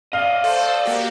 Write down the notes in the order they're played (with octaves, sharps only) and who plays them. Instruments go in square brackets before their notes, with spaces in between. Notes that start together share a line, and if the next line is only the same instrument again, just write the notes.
[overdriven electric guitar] D5 D#5 [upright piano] F5 G7
[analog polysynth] A4 C5
A#3 F#4 G4